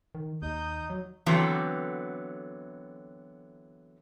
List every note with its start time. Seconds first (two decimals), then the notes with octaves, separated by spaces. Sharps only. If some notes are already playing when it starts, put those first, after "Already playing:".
0.15 D#3
0.42 D#2 D#4 D#6 G6
0.90 F#3
1.26 D3 E3 F#3 B3 C4 A4